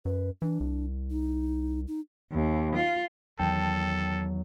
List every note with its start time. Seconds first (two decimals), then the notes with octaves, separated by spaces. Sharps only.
0.05 F#2 B4
0.42 E3 D4
0.60 C2
1.10 D#4
1.88 D#4
2.32 D#2
2.76 F4
3.39 E2 D#3 F#3 A4 G5 A5